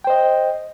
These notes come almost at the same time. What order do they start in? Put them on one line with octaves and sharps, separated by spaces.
G5 C5 D#5